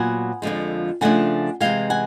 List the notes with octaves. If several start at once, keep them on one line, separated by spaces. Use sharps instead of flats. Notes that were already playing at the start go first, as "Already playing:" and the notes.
Already playing: A#2 F#3 B3 F#5 G#5
F2 D3 F3 G#3
C#3 F3 A3 D4 F#5 G#5
C3 E3 G#3 F5 G5
F#5 G#5